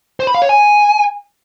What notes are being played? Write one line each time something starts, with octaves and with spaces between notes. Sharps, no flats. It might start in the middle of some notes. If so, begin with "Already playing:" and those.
C5
B5
F5
C#5
G#5